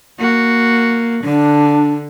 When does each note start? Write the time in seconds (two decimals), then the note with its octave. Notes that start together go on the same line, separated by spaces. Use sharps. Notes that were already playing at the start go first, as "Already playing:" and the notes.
0.19 A#3 F#4
1.24 D3 D4